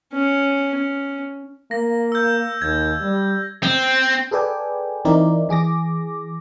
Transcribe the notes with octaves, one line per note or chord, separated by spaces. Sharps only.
C#4
C#4
A#3 A#6
E6 G6
D#2 G#6
G3
C4
G#4 A4 B4 D5 G5 G#5
E3 C4 D#4 E4 A#4 D5
E3 G#4 D6 A#6